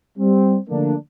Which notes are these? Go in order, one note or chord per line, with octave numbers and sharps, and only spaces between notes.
G3 C4
D3 F3 A3 A#3 D4